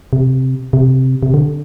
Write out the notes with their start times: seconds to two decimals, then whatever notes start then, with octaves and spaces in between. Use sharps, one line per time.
0.13 C3
0.73 C3
1.23 C3
1.34 D3